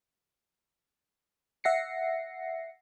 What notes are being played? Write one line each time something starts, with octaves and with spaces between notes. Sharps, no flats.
E5 F#5 A#6 C7 C#7